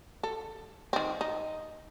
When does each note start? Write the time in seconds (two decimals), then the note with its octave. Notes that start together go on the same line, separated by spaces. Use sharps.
0.23 A4
0.93 D#3 C4
1.21 D#4